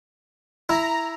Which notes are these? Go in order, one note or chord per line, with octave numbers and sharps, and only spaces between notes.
E4 A#5